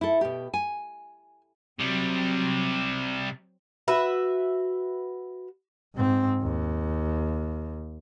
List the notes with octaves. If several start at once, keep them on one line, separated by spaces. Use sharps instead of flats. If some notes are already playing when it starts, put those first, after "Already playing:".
E4 A4
B2 G4
G#5
C3 F#3 G3 C4
F#4 B4 E5
G#2 C4
D#2